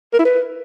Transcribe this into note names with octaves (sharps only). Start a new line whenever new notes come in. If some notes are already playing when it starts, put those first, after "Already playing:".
A#4
E4
B4